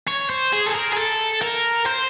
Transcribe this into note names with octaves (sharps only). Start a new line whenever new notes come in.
C#5
C5
G#4
A4
A#4
G#4
A4
A#4
C5